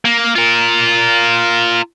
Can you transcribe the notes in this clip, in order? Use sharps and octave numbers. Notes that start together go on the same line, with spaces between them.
A#3
F4 A#4